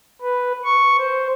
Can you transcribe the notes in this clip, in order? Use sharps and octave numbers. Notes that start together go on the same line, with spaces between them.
B4
C#6
C5